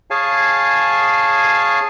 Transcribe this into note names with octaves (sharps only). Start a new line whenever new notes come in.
G#4 C#5 F5 G#5 A5